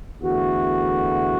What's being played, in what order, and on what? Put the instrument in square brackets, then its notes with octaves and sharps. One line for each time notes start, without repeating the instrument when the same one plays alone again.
[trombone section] E2 D3 A3 F#4